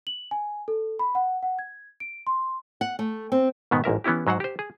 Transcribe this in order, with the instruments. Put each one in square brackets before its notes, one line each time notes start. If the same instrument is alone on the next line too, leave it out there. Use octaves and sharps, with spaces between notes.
[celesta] F#7
G#5
A4
B5
F#5
F#5
G#6
D7
C6
[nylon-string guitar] F#5
A3
C4
[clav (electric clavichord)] G#2 B2 D#3 B3
A1 G#2 A#4 E5
E3 B3 C#4 E4 G4
G#2 F#3 C5 F#5
G4 C5
G#4